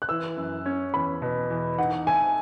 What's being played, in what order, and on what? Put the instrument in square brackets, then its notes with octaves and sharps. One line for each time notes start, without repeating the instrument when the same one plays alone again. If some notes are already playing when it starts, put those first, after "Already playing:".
[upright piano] F#6
[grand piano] E3 [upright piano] E6
[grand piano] F#2
C#4
[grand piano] E2 [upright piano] B5
[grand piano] B2
E2
[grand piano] D#4 [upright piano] F#5
[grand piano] A3 [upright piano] G#5